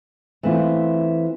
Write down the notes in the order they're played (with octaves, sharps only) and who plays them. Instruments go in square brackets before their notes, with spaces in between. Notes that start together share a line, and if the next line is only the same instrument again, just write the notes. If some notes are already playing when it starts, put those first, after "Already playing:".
[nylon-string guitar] E3 A3 C4 F4